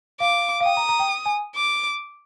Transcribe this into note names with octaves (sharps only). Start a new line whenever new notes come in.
F5 D6
F5
G5 D#6
A#5
A#5
G5
G#5
D6